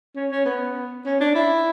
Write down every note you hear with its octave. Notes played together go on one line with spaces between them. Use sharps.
C#4
C#4
B3
C#4
D4
E4